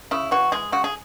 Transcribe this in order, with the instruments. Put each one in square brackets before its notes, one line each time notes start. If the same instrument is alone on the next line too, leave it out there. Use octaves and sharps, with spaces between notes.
[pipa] C#3 E4
E3 F#4
G#3 G#4
C#3 F#4
G#4